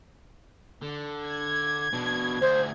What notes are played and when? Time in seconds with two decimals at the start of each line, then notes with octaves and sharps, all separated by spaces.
0.82 D3
1.26 G#6
1.93 B2 D4
2.41 D2 G#4 C5